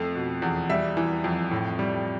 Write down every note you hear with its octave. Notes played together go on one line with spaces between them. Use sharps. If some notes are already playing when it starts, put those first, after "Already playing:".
Already playing: F2 A3
B2
E2
G3 E5
E3
F2
A2
G3